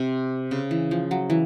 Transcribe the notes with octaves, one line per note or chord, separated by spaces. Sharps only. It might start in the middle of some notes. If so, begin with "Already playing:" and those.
Already playing: C3
C#3
E3
F3
F#3
E3